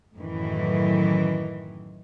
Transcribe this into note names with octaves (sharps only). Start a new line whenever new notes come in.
F#2 A2 D#3 E3